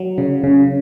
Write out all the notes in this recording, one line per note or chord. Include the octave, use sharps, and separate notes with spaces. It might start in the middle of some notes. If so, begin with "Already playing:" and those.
Already playing: F#3
C#3
C#3